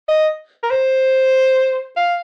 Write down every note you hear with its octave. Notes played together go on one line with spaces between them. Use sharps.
D#5
A#4
C5
F5